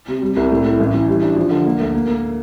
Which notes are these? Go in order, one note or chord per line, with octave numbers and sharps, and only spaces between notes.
C3
G3
C2
A2
A2
A1
E3
G3
D4
F3
D3
A#3
D2
A#3
A#3